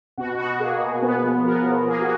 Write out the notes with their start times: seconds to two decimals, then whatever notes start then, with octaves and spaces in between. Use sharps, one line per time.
0.18 B2 F#4
0.39 B2 F#4
0.60 A#3 G#4
0.81 B2
1.02 B3
1.24 F3
1.44 B3 A#4
1.66 F3
1.87 A#3 G#4
2.02 F#4